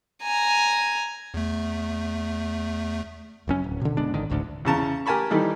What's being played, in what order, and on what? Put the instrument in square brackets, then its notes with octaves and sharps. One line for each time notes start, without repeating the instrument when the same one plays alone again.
[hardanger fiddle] G#5 A#5
[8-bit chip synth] E2 A3
[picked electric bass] F#1 F#2 C#4
D1
B2 D3
F#1 G#3 B3 D4
A1 G#2 D3 D#3
D1 A1 D2 D3
[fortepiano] E2 C#3 A5 A#5
G4 A#4 G#5 A5 B5 C#6
D#3 E3 G3 D#4 A4